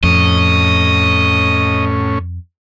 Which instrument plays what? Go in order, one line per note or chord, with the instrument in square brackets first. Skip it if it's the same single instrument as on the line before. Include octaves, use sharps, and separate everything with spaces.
[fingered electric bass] F2 [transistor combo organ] A2 C#4 [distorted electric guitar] D#5